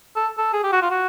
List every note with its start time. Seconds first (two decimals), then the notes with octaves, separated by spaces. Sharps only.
0.16 A4
0.38 A4
0.53 G#4
0.64 G4
0.72 F#4
0.82 F4
0.91 F#4